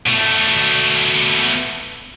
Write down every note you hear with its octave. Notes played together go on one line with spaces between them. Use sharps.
B2 A3